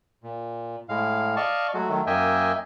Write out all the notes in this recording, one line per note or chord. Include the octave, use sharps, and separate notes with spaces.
A#2
A2 G#3 F5
D5 D#5 F5 A5 C#6
F#3 G#3 A3 F#4
D#3 F#3 A3
F#2 A#3 D#5 E5 G5 G#5